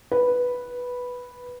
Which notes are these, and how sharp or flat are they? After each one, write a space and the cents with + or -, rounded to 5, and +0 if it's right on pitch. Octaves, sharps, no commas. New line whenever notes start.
B4 -5